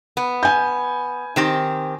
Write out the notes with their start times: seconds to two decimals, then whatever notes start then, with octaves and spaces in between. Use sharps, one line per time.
0.17 B3
0.43 G#5 G6
1.36 D#3 C4 G4